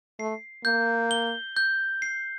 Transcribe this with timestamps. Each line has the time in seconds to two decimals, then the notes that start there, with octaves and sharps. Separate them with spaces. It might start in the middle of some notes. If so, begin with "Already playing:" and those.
0.19 A3 C7
0.65 A#3 G6
1.11 G7
1.57 G6
2.02 C7